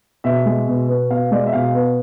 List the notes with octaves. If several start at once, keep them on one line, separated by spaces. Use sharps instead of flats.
B2 E5
G#3
B2
B3
B2 F5
G#3 D5
D#5
E5
B2 F5
B3